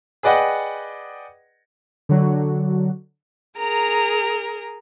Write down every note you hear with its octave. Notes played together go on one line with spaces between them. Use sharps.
G#4 B4 D5 D#5 F#5 G5
D3 F#3 F#4
G#4 A#4 A#5